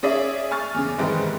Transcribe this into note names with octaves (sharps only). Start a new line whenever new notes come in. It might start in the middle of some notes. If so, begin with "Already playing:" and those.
C#4 G#4 D5 E5
G#5 C#6 F6 A6
E2 C#3
G#2 C3 D#3 E3 G3 G#3